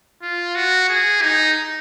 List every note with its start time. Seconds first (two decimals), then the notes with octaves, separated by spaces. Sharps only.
0.22 F4
0.56 F#4
0.89 G#4
1.22 D#4